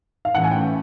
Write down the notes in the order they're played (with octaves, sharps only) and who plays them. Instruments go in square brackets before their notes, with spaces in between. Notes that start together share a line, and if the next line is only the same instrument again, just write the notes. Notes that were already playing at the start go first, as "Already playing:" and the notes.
[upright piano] F5
[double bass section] A2 E3 A3 C#4 [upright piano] F#5
[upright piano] G#5
G5